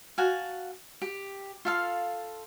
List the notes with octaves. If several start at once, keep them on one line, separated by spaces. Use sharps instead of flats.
F#4 F5 G#5 A5
G4
F4 A4 F5